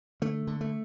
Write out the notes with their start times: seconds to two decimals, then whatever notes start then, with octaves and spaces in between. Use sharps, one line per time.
0.22 D3 A3
0.47 D3
0.61 A3